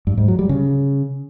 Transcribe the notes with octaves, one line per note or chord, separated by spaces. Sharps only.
G2
G#2
F#3
G3
C#3